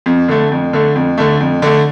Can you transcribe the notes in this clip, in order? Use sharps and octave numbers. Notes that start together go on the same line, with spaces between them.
F2
D3 A3
F2
D3 A3
F2
D3 A3
F2
D3 A3